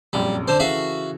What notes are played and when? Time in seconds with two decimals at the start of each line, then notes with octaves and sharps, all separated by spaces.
0.13 F1 A#1 F#2 G3
0.48 D3 C5
0.60 C#3 E3 F#4 A4 E5 F5